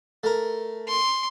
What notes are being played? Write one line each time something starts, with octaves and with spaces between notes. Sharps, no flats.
A3 A#4
C6